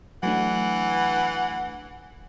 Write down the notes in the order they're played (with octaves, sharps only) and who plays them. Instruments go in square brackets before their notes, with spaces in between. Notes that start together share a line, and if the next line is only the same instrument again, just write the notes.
[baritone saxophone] E3 [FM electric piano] F#3 A3 D4 [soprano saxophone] F#5